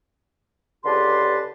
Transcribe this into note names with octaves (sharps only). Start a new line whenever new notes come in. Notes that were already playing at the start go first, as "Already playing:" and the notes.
C#2 D3 G4 B4 A5 C6